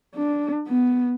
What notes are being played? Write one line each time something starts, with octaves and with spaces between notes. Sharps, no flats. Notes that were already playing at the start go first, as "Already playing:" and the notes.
D4
B3